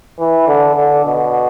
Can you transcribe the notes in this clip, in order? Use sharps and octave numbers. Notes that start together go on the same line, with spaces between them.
E3
D3
D3
B2